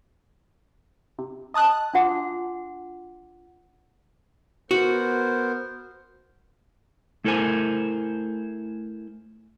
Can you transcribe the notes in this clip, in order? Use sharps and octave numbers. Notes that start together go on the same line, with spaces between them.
C3
D#5 A5 D#6 F#6
D4 F4 F#5 C6 D6
B3 F#4 A#4 C5
A3 E4 A4 A#4 C5 G#5